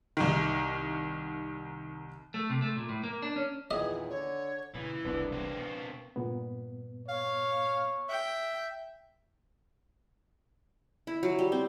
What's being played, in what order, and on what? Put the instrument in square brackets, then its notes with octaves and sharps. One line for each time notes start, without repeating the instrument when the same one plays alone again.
[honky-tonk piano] C2 D#3
[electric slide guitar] A3
C3
A3
A#2
A2
A#3
D4
C#4
[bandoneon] E2 A#2 D#3 [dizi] G#4 [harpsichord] D#5
[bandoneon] D3 [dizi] C#5
[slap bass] A#2 C#3 [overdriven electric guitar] E3
[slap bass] E1 C2 [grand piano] B3 D4
[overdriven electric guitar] A#3 C4
[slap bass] B2
[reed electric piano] G2 A#2 B3
[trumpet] C#5 [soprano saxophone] F5
[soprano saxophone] E5 [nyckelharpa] G5
[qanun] E4
F#3
G3
C4